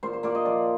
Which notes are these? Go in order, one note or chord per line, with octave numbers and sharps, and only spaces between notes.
A#2 C5
C5
A#2 D5
D#5
F3 D5